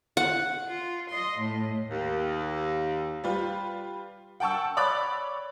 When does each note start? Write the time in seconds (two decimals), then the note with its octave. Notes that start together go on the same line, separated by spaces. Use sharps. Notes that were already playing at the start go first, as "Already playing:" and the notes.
0.17 F#5
0.67 F4
1.08 D#5 C6
1.38 A2
1.89 D#2
3.24 G3 F4 B4
4.40 F#5 G5 A5 C#6 E6
4.77 C#5 D5 B5 D6 F#6 A6